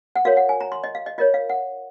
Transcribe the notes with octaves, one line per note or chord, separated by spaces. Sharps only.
F#5
F#4 A#4 C#5 F5
F#5
G#5
A#5
C6
D#5
F5
D#5
F4 A#4 C#5 D#5
F5
F#5